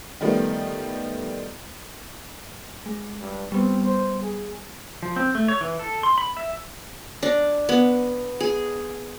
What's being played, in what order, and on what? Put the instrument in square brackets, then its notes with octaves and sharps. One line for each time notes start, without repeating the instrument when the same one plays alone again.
[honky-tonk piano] D#3 F3 G3 A3 B3
[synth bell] G#3
[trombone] G2
[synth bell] G3 B3 [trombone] C4
[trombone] C5
G#4
[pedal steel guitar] F3
C4
A3
C#5
E3
A4
C6
B5
E5
[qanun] D4
B3
G#4